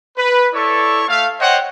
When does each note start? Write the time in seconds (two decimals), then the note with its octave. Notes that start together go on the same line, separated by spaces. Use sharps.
0.17 B4
0.54 E4 A4 C#5 D5 C#6
1.08 A3 F5
1.40 C5 C#5 D#5 F#5 G5